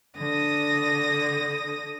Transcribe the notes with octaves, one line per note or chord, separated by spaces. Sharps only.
D3 D#6 A#6